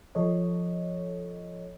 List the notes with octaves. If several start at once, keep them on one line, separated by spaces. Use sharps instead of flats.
F3 A4 C#5 D#5